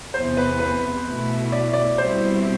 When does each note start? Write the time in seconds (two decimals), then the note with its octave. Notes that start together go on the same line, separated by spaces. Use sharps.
0.14 E2 C3 E3 B3 C5
0.37 B4
0.60 B4
1.06 B2 A3 E4
1.52 D5
1.73 D5
1.98 B2 G3 C4 E4 C5